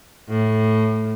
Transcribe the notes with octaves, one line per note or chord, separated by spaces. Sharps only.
A2